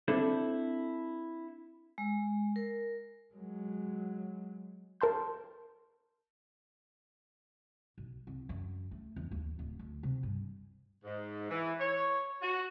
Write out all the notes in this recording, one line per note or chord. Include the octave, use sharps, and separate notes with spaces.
C4 D4 E4 A4 C5
G#3
A#4
F#3 G#3
A#4 A5 C6 G6
B1
C2
F#2
A3
E2
D#2
D1
D2
C3
G2
G#2
E3
C#5
F#4